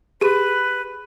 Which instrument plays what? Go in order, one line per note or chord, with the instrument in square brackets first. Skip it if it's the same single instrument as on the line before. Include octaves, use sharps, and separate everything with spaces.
[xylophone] G4 G#4 D#7 [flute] B4